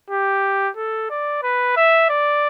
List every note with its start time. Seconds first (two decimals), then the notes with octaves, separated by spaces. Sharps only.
0.10 G4
0.77 A4
1.10 D5
1.43 B4
1.77 E5
2.10 D5